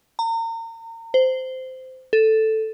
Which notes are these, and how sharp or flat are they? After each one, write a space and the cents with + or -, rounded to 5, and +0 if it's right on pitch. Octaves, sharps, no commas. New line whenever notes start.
A#5 -35
C5 -15
A4 +0